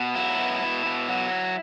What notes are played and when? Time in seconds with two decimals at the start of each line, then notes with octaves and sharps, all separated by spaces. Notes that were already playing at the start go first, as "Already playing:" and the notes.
Already playing: B2
0.15 F#3 E4
0.38 B2
0.62 B2
0.86 B2
1.08 F#3